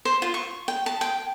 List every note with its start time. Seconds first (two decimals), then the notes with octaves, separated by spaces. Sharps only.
0.05 C5
0.22 F4
0.34 C#6
0.68 G5
0.86 A5
1.01 G5